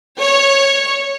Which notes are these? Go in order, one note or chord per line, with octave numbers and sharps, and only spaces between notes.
C#5